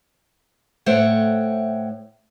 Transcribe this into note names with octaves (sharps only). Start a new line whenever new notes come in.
A2 A3 C5 C#5 F#5 G5